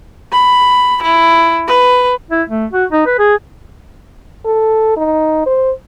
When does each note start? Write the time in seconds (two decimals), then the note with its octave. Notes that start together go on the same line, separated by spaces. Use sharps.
0.32 B5
1.03 E4
1.68 B4
2.30 E4
2.49 A3
2.72 F#4
2.92 D#4
3.06 B4
3.19 G#4
4.46 A4
4.97 D#4
5.46 C5